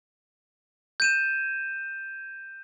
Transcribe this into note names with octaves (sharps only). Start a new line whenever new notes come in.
G6 D#7 E7